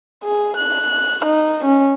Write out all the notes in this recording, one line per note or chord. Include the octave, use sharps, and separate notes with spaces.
G#4
F#6
D#4
C#4